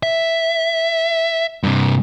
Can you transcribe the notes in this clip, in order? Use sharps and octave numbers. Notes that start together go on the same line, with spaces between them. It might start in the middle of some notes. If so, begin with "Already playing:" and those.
E5
G2 C3